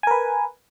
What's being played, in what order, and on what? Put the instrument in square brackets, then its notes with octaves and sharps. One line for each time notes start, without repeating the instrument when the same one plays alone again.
[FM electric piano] G#5
A#4
B4